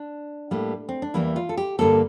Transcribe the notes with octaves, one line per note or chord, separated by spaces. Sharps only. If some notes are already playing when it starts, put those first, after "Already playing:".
Already playing: D4
A2 G3 A#3
C4
D4
E2 E3 G3 A#3 E4
F4
A4
G4
G2 D3 G3 A#3 A4